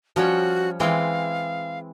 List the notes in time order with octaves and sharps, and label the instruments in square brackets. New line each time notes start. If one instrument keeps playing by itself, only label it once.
[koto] F3 G3 C#4 [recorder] F#4
[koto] E3 G#3 C4 [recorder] F5